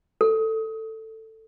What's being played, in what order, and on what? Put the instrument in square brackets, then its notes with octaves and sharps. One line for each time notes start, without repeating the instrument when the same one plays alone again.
[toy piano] A4